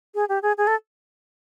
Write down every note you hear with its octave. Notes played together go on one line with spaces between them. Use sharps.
G#4
G4
G#4
G#4
A4